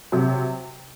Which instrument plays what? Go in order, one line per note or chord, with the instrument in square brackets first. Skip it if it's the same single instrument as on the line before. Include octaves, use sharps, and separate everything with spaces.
[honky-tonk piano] C3 F#3 C4